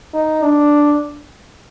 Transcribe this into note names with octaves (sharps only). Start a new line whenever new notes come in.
D#4
D4